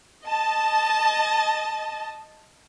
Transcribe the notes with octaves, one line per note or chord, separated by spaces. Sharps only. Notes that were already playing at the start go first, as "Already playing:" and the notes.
D#5 A5